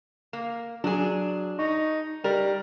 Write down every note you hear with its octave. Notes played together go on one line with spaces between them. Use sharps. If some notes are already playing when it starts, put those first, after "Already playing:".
A#3
F#3 D4 G#4
D#4 C#6
G3 A#4